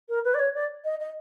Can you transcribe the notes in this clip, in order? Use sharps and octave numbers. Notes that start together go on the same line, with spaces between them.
A#4
B4
D5
C#5
D5
D#5
D#5